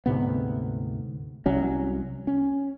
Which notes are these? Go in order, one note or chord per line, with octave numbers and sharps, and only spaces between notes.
D2 G#2 C3 B3
C2 F#3 C#4
C#4